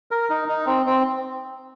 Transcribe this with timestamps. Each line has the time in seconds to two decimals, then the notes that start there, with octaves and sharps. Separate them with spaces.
0.11 A#4
0.30 D#4
0.48 D#4
0.67 C4
0.86 C4